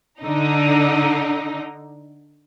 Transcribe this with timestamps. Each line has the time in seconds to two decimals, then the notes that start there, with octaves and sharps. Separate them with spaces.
0.21 D3 D#4